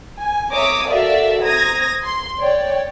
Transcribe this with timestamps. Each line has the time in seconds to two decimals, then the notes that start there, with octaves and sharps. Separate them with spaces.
0.19 G#5
0.52 C#5 E5 A#5 D6 D#6
0.89 F#4 A4 A#4 D5 E5 F5
1.42 C5 A#5 D#6 G#6 A#6
2.02 C6
2.39 C#5 D5 G5